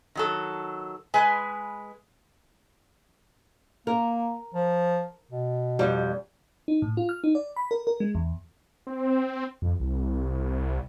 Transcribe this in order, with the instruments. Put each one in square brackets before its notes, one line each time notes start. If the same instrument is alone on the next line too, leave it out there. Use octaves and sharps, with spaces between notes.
[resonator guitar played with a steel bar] D#3 F#3 A4
G#3 B4 G#5
[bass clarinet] A#3 [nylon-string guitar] A#4
[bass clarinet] F3
B2
[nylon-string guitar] F2 G3
[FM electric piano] D#4
A2
F4
F6
D#4
D5
B5
A#4
A#4
G#3
E2
[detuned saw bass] C4
F2
C2